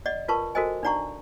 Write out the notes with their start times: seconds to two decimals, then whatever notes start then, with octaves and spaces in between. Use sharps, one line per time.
0.06 D5 D#5 F#5
0.28 F4 A#4 B4 A5 C#6
0.55 F#4 A4 A#4 C5 D#5 G#5
0.83 D4 D#4 D5 F#5 A#5 C#6